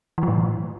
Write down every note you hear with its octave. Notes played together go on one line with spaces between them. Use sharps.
E3
F3
A2